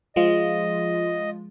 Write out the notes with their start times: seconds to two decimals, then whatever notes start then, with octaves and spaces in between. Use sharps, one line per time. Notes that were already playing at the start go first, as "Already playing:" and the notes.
0.16 F3 G#3 F4 D#5